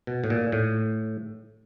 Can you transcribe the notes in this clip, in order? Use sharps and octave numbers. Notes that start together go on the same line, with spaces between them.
B2
A2
A#2
A2